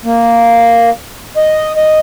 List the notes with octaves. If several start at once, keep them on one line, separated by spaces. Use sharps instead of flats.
A#3
D#5
D#5